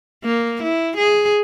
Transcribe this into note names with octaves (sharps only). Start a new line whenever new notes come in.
A#3
E4
G#4